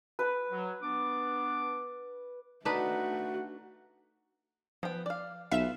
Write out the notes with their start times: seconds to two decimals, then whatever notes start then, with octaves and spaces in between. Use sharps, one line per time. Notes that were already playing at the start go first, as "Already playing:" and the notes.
0.19 B4
0.51 F#3
0.82 B3 D4 D6
2.65 A3 D4 D#4 F#4 B4
4.83 F3 B3 G5
5.06 D5 F5
5.52 B1 F4 B4 E5 F5 E7